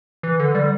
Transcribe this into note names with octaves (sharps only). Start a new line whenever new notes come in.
E3
D3
G3